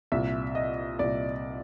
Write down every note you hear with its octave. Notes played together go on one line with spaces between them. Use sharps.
C2 A#2 E5
D#5
C2 A#2 D5